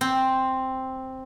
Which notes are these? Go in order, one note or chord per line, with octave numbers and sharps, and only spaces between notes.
C4